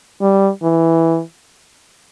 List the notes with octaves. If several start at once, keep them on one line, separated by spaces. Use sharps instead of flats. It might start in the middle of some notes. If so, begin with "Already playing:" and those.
G3
E3